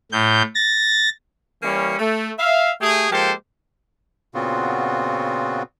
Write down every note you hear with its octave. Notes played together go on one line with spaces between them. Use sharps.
A2 G6
A6 A#6
E3 G3 A#3 C#4
A3
E5 F5
A3 G4 G#4
F3 G#3 A#3 G4 A4 C5
A#2 C#3 B3 C4 F4 F#4